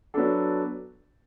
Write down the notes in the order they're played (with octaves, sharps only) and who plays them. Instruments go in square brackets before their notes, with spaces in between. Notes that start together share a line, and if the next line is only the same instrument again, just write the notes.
[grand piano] F#3 B3 D4 A4